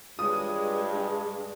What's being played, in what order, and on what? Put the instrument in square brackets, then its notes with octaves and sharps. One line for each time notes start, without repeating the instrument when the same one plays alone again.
[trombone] G2 [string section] G#3 [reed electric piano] F4 B4 C#5 [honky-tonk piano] D#6
[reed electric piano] D4 G#4